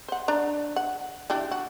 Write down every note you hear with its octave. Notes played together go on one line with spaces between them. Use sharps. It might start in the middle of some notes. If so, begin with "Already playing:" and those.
C5 F#5
D4 A#5
F#5
E3 D4 G4
F#4